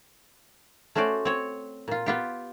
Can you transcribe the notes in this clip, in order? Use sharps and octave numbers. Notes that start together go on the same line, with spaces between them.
A3 C#4 F#4 C5 D5
C4 C#5
A#2 F4
B3 F4 G4